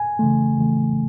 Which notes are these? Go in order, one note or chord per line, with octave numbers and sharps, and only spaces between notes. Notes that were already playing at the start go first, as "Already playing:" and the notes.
Already playing: G#5
C#3 E3 A3
C#3 E3 A3